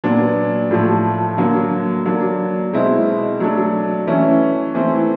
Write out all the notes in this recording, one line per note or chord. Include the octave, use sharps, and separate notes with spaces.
A#2 F#3 B3 D4
A2 F3 A3
D3 F#3 A#3
F#3 A#3 D4
B2 G#3 C4 E4
F#3 A3 D4
E3 A3 C#4 E4
E3 A3 C4 E4